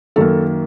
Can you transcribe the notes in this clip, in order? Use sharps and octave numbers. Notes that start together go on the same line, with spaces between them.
F#2 D#3 A#3 A4